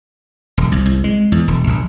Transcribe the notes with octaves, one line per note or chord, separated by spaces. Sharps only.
E1
C2
C2
G#3
E2
E1
A#1